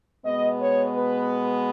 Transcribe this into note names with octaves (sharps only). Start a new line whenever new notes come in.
B2 G#3 B3 D#5
C#5
B4